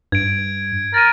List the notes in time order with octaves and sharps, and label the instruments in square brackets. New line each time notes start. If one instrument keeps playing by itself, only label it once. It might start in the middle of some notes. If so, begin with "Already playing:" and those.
[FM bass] G2 [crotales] G#6 D7
[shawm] A#4 [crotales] A6 D#7